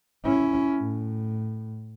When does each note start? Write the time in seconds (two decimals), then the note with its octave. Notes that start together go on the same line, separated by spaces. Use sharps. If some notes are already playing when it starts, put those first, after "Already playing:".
0.25 C#4 E4
0.79 A2